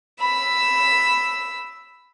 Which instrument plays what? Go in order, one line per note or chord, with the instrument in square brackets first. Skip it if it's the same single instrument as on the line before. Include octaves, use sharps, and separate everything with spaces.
[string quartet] B5 E6